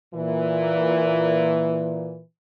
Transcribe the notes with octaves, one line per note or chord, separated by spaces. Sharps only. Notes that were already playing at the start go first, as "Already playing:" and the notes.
A#2 E3